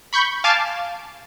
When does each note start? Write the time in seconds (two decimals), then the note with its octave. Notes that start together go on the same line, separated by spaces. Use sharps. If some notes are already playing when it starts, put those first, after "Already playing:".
0.13 B5 C#6 G6
0.44 F5 G#5 A5 D6 A6